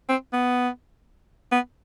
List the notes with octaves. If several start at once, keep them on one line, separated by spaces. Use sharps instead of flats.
C4
B3
B3